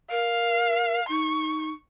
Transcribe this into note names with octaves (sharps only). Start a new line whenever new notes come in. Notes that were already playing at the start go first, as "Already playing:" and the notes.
A#4 F5
D#4 C#6